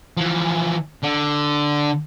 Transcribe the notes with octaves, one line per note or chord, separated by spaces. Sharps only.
E3 F3
D3